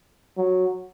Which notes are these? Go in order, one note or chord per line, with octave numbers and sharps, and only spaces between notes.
F#3